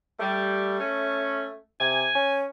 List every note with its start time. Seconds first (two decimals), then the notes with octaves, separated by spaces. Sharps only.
0.20 G3 A3
0.79 C#4
1.80 C3 G#5
2.15 C#4